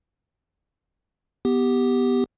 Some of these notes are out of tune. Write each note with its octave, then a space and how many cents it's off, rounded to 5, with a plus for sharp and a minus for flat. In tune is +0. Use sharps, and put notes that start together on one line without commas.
B3 +0 G4 +0